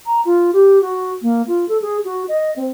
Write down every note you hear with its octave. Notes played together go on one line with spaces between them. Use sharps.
A#5
F4
G4
F#4
A#3
F4
A4
G#4
F#4
D#5
C4